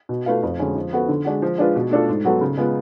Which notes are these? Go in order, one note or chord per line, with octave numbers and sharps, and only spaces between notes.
B2
A3 F4 B4 F5
F2
D3 G#3 C#4 F#4
F3
B3 F#4 A4
D3
G#3 D4 F#4
F3
G#3 D4 F4 B4
B2
A3 D4 F4 A4
G#2
F#3 B3 F#4 A4
C#3
G#3 B3 F4